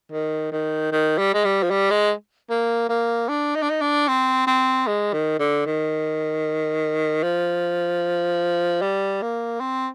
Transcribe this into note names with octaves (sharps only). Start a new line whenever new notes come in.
D#3
D#3
D#3
G3
G#3
G3
F3
G3
G#3
A#3
A#3
D4
D#4
D4
D#4
D4
C4
C4
G#3
D#3
D3
D#3
F3
G3
A#3
C4